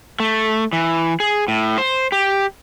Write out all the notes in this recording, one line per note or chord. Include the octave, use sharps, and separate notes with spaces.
A3
E3
G#4
A2
C5
G4